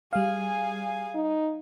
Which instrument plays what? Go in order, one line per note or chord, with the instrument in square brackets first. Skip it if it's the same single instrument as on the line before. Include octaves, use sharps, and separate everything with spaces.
[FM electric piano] G3 F5 [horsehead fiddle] G#4 G#5
[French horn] D#4